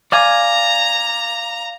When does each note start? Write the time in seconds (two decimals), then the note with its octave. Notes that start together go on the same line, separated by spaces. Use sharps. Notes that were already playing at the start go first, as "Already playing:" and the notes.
0.12 D5 F5 G#5 A#5